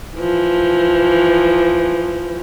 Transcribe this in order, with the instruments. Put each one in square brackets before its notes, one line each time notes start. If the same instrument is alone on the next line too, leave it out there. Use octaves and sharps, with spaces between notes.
[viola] E3 F3